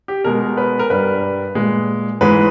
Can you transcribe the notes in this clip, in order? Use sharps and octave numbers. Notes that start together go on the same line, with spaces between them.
G4
B2 G#3 A#4
B4
A#4
G2 G3 B4
A#2 G#3
G#2 E3 G#3 B4